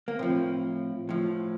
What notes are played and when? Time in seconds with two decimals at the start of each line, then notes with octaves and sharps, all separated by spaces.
0.08 A#3
0.19 A2 F3 C4
1.09 A2 F3